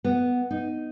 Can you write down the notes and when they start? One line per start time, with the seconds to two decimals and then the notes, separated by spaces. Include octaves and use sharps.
0.04 B3
0.51 D#4